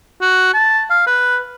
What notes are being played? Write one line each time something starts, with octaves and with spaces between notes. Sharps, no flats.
F#4
A5
F5
B4